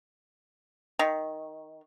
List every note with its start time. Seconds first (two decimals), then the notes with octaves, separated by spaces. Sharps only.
0.99 D#3